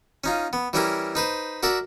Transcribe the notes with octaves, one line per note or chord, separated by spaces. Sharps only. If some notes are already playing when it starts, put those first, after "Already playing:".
C#4 D#4 F4
B3
E3 G3 C#4 E4 G4 A#4
D#4 B4 C5
F#4 A#4 D5 E5